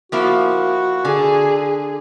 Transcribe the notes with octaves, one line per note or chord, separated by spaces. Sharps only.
F3 A#3 E4 F#4
D3 G#4